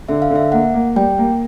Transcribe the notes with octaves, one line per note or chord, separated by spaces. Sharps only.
D3 E5
F5
D3
E5
A#3 F#5
A#3
G3 G5
A#3